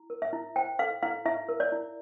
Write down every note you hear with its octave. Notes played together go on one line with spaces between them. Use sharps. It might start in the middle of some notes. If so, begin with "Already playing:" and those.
Already playing: E4
A#4
E5
E4
C5 G5
A4 F5
E4 F5
E4 E5
A#4
D5
E4